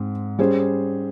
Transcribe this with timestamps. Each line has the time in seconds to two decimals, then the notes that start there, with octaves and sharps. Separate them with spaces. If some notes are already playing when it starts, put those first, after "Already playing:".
Already playing: G#2 C4
0.39 G3 C#4 G#4 C5